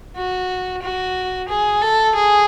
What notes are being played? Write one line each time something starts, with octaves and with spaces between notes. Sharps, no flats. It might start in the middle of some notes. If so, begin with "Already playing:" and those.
F#4
F#4
G#4
A4
G#4